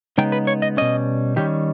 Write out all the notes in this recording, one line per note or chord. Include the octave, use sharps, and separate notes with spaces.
C#3 G#3 B3 D#4 G5
B4
C#5
D#5
B2 G3 C#4 D#5
D#3 G3 C#4 G4